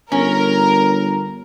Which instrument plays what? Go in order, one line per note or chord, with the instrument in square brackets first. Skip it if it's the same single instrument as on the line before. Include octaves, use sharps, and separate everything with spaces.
[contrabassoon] G1 [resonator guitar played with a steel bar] C#4 [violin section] A#4